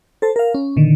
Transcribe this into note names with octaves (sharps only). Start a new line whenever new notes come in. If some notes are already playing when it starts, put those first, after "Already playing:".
A4 C5 A5
A#4 F5
C#4
A#2 D3 D#3